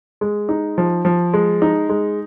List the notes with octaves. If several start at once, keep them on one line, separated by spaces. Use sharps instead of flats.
G#3
D#4
F3
F3
G#3
D#4
G#3